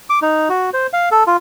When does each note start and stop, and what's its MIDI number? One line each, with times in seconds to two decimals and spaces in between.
0.10 0.19 86
0.22 0.49 63
0.49 0.70 66
0.73 0.87 72
0.93 1.09 77
1.11 1.24 69
1.27 1.37 65